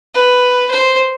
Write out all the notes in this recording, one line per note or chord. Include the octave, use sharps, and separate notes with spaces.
B4
C5